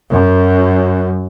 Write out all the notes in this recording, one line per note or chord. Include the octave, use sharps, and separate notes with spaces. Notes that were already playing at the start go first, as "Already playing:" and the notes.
F#2